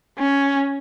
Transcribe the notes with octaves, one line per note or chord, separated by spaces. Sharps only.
C#4